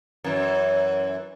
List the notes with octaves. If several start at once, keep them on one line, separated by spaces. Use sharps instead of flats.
F#2 E3